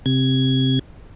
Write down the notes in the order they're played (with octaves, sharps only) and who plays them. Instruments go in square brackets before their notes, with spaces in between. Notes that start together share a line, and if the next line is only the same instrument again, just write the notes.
[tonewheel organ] C3 G#6